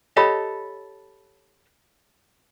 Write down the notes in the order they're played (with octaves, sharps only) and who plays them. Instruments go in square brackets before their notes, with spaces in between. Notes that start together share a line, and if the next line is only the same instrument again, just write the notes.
[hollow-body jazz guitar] G4 A4 D#5 [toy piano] C#5 B5